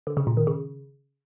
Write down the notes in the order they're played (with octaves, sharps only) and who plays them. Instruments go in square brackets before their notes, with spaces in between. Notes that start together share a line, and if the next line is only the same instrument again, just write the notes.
[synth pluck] D3
C#3
A#2
D#3
C#3